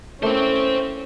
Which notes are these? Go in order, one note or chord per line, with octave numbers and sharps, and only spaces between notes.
A3 A#3 C#4 E4 C5 G5